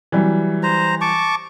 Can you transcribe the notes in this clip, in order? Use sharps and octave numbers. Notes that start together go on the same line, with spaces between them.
E3 F#3 G3
C5 A#5
A5 C#6 D6